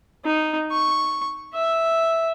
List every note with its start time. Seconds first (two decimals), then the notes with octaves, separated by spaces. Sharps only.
0.25 D#4
0.72 C#6
1.54 E5